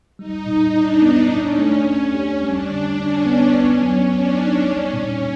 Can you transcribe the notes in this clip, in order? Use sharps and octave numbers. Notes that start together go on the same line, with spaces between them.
G3 D#4
A#2
D4 E4
B3
C#4 D4
A3
A3
G4
G3 D4
D3
C#4 D4
B3
B3
F#3
F#3 D4
D#4
G3 C#4
A#2